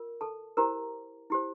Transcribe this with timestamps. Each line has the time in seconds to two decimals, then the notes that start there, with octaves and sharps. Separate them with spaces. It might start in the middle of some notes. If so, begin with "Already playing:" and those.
Already playing: F4 A#4
0.21 A4 A5
0.57 E4 G4 A#4 C5 A#5
1.30 E4 G4 C5